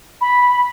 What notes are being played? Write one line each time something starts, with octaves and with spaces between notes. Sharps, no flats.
B5